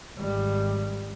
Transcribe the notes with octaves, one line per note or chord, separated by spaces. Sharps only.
G#1 G3